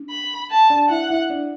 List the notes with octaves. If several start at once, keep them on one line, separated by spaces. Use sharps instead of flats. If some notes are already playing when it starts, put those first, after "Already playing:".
Already playing: D4
B5
A5
D4 D5
E4 E5 F#5
E4 E5
D4 D5